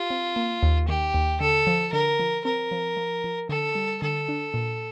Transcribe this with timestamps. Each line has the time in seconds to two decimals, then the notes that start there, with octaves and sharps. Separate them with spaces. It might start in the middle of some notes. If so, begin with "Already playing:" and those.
Already playing: F4 G4
0.10 C4
0.36 A#3
0.63 D#2
0.88 D#3 G4
1.14 D#2
1.40 D3 A4
1.67 F3
1.93 D3 A#4
2.20 F3
2.44 C4 A#4
2.71 F3
2.97 F3
3.24 F3
3.49 D3 A4
3.75 G3
4.02 D3 A4
4.28 D4
4.54 A#2